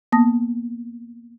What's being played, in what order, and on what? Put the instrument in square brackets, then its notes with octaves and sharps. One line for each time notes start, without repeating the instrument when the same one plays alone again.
[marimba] A#3 B3 A5 D#6 A#6